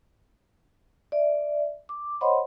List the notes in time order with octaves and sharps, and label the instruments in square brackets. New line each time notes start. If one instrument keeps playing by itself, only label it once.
[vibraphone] D5 E5
D6
C5 C#5 D#5 F#5 B5 C6